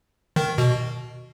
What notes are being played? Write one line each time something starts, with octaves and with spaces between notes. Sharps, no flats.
D#3
B2